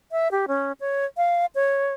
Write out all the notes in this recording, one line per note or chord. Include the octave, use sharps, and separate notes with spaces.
E5
G4
C#4
C#5
F5
C#5